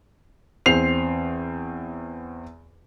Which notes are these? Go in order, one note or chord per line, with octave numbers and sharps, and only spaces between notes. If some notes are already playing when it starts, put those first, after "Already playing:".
E2 C4 C7 F7